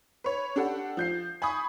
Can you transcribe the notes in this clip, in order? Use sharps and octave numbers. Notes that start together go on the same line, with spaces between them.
B4 C#5
D4 G4 A4 F#5
F3 G6 C7
G#5 B5 C#6 D#6